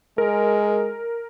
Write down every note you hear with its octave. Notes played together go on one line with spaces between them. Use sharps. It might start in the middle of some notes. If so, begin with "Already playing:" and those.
G#3 A#4